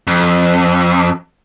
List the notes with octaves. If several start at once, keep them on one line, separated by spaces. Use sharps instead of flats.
F2